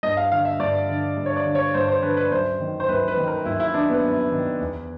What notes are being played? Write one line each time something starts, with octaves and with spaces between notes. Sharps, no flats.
G2 D#5
F5
D3 F5
E5
G2 D5
D3
G2
C#5
D5
D3
C#5
G2 C5
C5
D3 B4
B4
F#2 C5
D#3
C5
F#2 B4
B4
D#3
A#4
F#2 E4
E4
D#3 D4
B3
F#2
D#3
E2